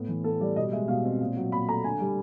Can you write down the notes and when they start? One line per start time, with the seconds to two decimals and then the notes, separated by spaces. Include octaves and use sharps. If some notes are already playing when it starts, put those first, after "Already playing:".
Already playing: A2 B3
0.09 E3
0.24 B3 A4
0.41 G3 D5
0.56 B2 D#5
0.72 G#3 E5
0.88 B2 F5
1.05 C4
1.21 A#2
1.36 F#3
1.52 A#2 B5
1.68 A3 A#5
1.84 D3 G#5
2.00 G3